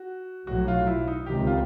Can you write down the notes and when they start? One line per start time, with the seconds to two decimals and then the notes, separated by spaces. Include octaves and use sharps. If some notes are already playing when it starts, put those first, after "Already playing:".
Already playing: F#4
0.47 B1 A2 F#3 F#4
0.68 F4
0.87 E4
1.08 D#4
1.26 C#2 C3 D#3 G4
1.47 F4